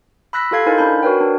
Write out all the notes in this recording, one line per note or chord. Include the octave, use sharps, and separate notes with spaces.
B5 E6 F#6 A#6 B6
F4 G4 A4 F5 G#6 C7
D#4 E4 A#4 C5 F5 G#5
D4 G#5 B5 G6
F#4 A#4 B4 C#5 G5
D4